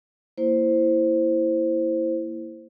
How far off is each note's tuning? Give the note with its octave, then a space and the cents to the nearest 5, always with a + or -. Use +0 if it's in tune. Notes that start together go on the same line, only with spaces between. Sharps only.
A#3 +0 E4 +5 C5 +0